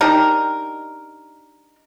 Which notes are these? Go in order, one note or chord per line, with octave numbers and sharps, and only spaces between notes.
D4 D#4 G4 A#4